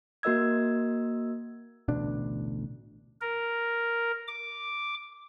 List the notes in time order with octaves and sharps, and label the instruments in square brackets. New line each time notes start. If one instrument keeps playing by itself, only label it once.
[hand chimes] A#3 F#4 A#4 D#5 E6 G#6
[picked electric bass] A1 D2 B2 D4
[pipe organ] A#4
D6